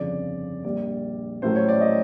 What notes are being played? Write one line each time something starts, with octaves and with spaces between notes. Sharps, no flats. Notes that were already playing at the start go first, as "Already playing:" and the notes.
Already playing: G1 F2 C#3 F3 D5
A#1 A#2 G3 D5
A1 A2 F#3 A3 C5
C#5
D5
D#5